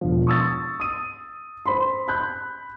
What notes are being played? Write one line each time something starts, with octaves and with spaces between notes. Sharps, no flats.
E1 F3
C#6 D#6 E6 A6
D#6 D#7
C5 B5 C6
B5 F#6 G6